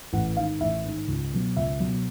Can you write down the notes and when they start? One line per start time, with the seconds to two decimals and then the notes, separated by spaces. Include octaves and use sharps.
0.13 A1 F#5
0.37 G#2 D#3 F5
0.61 A1 E5
0.85 G#2 D#3
1.08 C#2
1.33 B2 F#3
1.56 C#2 E5
1.80 B2 F#3